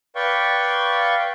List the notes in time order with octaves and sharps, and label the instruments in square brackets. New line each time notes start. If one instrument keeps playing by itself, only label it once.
[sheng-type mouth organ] B4 D5 F5 G5 C#6